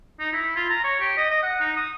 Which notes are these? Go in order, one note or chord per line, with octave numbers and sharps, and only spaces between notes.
D#4
E4
F4
A#5
C#5
G4
D#5
D#5
F#5
D#4
D#6